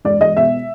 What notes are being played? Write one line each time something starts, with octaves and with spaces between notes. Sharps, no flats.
E1 D5
E1 D#5
B2 E5